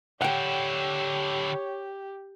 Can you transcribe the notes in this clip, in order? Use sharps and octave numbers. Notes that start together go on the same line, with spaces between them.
D3 E4 G4 C#5 F#5 G5